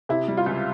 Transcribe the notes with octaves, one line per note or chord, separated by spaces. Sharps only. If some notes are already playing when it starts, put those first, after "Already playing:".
C3 E4
G3
F4
C#2